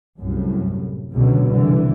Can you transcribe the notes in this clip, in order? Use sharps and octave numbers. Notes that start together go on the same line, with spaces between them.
C2 F#2 A2
C#2 B2 D3 F#3
C2 D3 E3